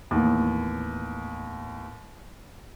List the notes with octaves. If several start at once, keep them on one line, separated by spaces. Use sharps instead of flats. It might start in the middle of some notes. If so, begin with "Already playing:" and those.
D#2 A2 E3 B3